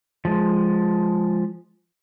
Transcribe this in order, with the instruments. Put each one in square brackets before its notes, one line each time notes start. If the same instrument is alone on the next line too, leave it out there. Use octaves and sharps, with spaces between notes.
[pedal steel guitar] F3 G#3